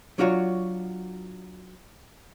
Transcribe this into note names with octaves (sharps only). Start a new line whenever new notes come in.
F#3 D4 F4 F#4 B4 C#5